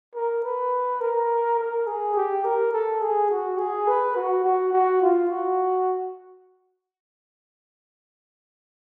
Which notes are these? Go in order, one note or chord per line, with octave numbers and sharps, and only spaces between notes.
A#4
B4
A#4
A#4
G#4
G4
A#4
A4
G#4
F#4
G#4
B4
F#4
F#4
F#4
F4
F#4